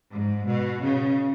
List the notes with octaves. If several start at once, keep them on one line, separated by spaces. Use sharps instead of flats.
G#2
B2
C#3